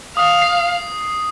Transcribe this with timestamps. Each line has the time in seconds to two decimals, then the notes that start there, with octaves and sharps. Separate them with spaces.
0.17 F5 D#6
0.42 C7